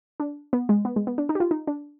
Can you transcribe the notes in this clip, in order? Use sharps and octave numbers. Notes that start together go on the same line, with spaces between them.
D4
B3
G#3
B3
G#3
B3
D4
D#4
G4
F4
D#4
D4